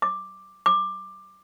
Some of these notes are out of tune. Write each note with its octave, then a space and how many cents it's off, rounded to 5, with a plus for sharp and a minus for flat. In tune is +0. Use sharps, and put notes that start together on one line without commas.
D6 +5
D6 +15